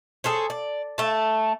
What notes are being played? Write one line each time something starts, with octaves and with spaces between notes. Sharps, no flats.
G#4 A4 C5 C#5
D5
A3 A5